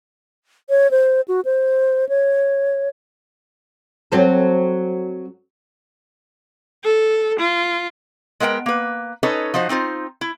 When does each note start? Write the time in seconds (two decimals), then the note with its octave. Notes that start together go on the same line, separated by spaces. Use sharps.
0.70 C#5
0.91 C5
1.28 F#4
1.45 C5
2.09 C#5
4.12 F#3 C4 A4
6.84 A4
7.39 F4
8.40 G#3 B3 A#4 F#5 G5
8.66 A#3 B4
9.23 C#4 D#4 A4 B4 C#5 D#5
9.54 F3 D#4 F#4 C5
9.69 C4 D#4 F4 C5
10.21 E4